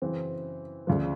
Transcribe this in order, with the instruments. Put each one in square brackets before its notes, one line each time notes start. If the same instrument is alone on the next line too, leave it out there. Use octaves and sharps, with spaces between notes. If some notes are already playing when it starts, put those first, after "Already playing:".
[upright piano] F#2 C#3 E3 C4
D2 C#3 F3 D4